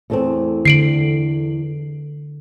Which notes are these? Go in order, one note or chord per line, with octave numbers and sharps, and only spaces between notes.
E2 A3 C4
D3 C7 D7 F#7